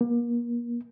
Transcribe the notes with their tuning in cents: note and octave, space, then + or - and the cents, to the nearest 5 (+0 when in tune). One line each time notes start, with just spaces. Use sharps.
A#3 +35